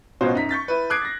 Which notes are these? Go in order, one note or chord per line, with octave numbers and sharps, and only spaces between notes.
A1 B2 F4 F#4 C5 C#5
F#2 D#4 A#5 B6
C#6 G6 A6 B6
E4 B4
D6 D#6 F#6 G#6 C7 D7
A6 A#6